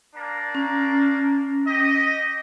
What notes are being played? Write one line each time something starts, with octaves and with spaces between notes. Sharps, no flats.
A#3 D4 A#5
C#4
G4 D#5